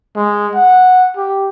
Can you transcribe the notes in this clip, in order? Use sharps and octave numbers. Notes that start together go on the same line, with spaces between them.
G#3
F#5
G4